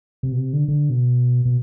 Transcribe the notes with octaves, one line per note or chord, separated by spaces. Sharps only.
C3
B2
C3
D3
D3
B2
B2